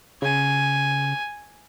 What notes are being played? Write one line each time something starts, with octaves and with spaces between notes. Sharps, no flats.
C#3 G#5